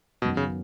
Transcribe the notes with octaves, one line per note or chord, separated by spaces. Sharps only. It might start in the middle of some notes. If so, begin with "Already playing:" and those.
F#2 B2 D#3 F#3 B3 F#4
C#3